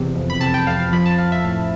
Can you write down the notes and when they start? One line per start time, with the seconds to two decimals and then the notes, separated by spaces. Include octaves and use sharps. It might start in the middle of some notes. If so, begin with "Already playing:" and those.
Already playing: E2 C3
0.15 F2
0.30 B5
0.40 C3 A5
0.54 G5
0.66 F2 F5
0.80 F5
0.92 F3 B5
1.06 A5
1.18 F3 F5
1.32 E5
1.44 A2 F5